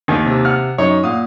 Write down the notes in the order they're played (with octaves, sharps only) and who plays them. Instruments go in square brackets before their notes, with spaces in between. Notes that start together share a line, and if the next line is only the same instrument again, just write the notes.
[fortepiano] D#2 D#3
[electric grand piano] C3
[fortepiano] F#5 F6
[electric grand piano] F#2 D#4 [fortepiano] C#5
[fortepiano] A#2 [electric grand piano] F5 F#5 D#6